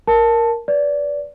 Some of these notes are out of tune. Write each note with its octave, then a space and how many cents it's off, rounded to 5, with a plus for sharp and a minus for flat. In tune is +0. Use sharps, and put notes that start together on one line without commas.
A#4 +0 A5 +0
B4 +0 D5 -20